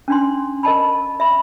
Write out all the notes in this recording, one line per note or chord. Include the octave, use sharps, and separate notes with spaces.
C#4 D4 C6
A#4 D#5 A5 B5
E5 B5